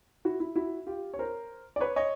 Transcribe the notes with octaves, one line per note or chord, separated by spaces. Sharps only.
E4 F#4
E4
E4 F#4
F4 G4
C#5
A#4 C5
D5
B4 C#5
C#5 D#5